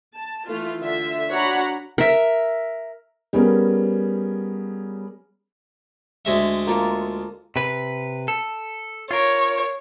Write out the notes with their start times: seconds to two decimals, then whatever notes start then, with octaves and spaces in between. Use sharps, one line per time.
0.14 A5
0.47 E3 A3 F4
0.82 D3 F4 E5
1.29 D4 F#4 C#5 F#5 A#5 B5
1.98 A#4 E5
3.33 G3 B3 C#4 G#4 A#4
6.25 D2 G#3 E5
6.67 A#3 F4 A4
7.56 C3 B4
8.28 A4
9.11 F4 A#4 C#5